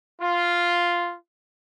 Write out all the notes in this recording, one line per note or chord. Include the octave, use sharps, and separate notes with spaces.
F4